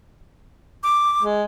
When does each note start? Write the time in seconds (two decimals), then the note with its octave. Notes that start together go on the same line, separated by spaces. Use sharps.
0.83 D6
1.22 G#3